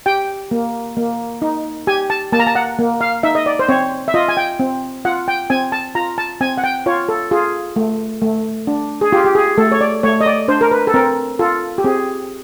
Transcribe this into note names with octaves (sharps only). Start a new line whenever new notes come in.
G4 G5
A#3
A#3
D#4
G4 G#5
A5
A#3 A5
A#5
A5
F#5
A#3
F5
D#4 E5
D#5
D5
C5
C4 C#5
E5
F4 D#5
G#5
G5
C4
F4 F#5
G5
C4 G#5
A5
F4 A#5
A5
C4 G#5
F#5
G5
F4 C#5
A4
F4 G#4
A3
A3
D4
G#4
F4 G4
G4
G#4
A3 A4
C#5
D5
A3 C#5
D#5
D5
D4 C5
A#4
B4
A4
C4 A#4
F4 A4
G4
C4 G#4